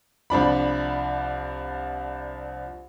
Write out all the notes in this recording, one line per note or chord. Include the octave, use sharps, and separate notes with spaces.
C2 F3 D4 B5